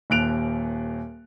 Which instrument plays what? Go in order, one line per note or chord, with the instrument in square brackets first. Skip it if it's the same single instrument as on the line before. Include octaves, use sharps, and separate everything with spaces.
[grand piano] D#1 D#2 F#6 D7 F7